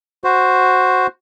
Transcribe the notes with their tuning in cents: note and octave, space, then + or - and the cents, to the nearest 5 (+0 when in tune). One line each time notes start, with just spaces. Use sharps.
F#4 +0 C5 +0